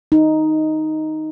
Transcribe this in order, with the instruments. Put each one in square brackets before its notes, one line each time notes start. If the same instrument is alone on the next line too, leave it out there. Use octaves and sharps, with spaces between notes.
[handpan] D#4